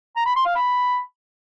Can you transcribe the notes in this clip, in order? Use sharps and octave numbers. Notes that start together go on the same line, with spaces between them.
A#5
B5
C6
F5
B5